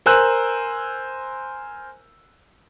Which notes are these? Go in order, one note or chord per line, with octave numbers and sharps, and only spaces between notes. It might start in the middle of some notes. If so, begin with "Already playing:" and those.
A#4 C5 G#5 E6 F#6